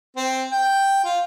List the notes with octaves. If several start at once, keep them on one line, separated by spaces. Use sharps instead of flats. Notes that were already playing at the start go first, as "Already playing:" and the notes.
C4
G5
F4